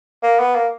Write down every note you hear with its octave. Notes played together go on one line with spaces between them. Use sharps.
A#3
B3
A#3